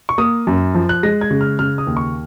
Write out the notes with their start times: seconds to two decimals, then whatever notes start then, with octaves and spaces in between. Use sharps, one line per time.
0.09 C#6
0.18 A#3 D#6
0.47 F#2
0.74 F3
0.89 F#6
1.03 G#3 A#6
1.21 G#6
1.31 C#3
1.41 F6
1.59 C#3 F6
1.78 D#6
1.87 D#2
1.97 C#6